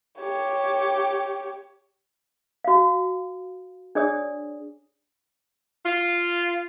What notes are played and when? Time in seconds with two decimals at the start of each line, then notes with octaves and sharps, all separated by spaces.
0.22 G4 C#5
2.64 F#4 F5
3.95 D4 G#4 C#5 D5 D#6
5.85 F4